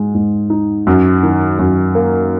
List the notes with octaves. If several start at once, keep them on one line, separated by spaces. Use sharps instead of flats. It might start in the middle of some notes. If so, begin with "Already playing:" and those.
Already playing: G#2 G#3
G#2
D#4
F#2
D#3
F#2
A#3